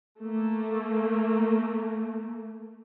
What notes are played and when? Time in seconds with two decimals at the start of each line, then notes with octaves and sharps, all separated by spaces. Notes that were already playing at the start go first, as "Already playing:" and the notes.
0.20 A3 A#3